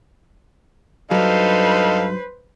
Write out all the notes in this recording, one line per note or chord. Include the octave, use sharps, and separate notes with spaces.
G2 F#3 D#4 A4 B4 C5 F5